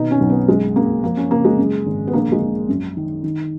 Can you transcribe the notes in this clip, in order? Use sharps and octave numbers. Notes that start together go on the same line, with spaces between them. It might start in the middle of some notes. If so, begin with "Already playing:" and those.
Already playing: B2 D#3 D#4
C#4
B1
B3
F#2 G#3
F#2 A#3
F3 A#3
C#4
C#3 A#3
G#3
F#2
G#1
B3
A#1 A#3
G#3
A#1
F#2
D#3
D#3